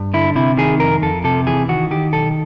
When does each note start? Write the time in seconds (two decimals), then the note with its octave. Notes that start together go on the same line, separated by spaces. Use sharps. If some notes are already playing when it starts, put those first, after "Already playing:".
Already playing: G2
0.14 D3 E4
0.35 C3 E4
0.57 D#3 G#4
0.80 F2 A#4
1.02 F2 A4
1.24 C3 A4
1.47 E3 G#4
1.69 D#3 F#4
1.91 D#3 G4
2.13 B1 A4